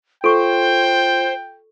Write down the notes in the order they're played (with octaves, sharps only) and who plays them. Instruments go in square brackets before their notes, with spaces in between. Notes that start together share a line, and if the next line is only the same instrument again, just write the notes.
[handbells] F4 [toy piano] A4 C#6 [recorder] C5 [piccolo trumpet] G5